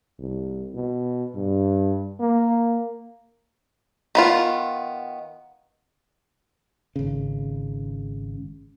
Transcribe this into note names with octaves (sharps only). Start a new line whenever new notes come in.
C2
B2
G2
A#3
D#3 B3 F4
G#1 C#3